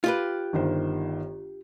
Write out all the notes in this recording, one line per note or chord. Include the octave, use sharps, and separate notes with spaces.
F4 G4 B4
G1 D#3 C5